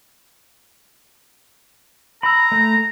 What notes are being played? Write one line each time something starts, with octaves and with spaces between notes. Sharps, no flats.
A#5 B5 E6
A3